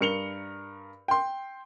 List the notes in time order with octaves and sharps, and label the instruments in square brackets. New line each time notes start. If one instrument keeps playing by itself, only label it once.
[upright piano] G2 A#4 C#7 F7 G7
G5 C6